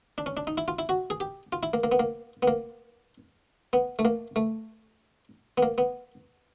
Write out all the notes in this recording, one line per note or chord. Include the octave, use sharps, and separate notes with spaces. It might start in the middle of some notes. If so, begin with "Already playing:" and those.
D4
C#4
D4
D#4
E4
F4
E4
F#4
G#4
G4
F4
E4
A#3
A#3
B3
A#3
B3
A#3
B3
A3
A#3
A3
B3
A#3
B3